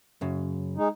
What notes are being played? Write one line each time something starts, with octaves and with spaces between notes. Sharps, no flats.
F#2 C#3
G#3 D#4